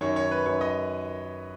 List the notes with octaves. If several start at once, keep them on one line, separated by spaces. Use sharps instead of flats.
F#2 D#3 C#5
C#5
B4
F#2 D#3 C#5
D#5